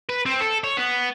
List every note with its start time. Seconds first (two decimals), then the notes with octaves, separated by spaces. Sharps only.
0.09 B4
0.26 C4
0.41 A4
0.64 C#5
0.77 B3